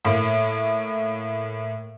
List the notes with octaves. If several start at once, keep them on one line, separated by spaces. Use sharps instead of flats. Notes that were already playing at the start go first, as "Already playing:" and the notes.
A2 A#3